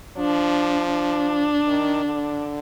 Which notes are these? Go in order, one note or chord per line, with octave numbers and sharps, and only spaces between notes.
F3 D4
D4
D#3
D3